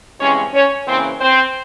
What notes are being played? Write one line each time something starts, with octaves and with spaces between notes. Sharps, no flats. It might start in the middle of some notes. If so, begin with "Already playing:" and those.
G2 E3 G#3 C4 C#4 C#5
C#4 C#5
C#3 E3 A#3 C4 C#4 C5
C4 C5